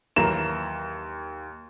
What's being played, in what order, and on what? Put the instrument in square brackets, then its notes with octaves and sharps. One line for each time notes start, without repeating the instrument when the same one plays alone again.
[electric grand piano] D#2 [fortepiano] E3 F#3 A#3 [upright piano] E7